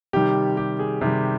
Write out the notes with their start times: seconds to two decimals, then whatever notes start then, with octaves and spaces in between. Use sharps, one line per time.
0.13 C3 D#3 G3 G4
0.57 G4
0.79 G#4
1.01 C3 D#3 G3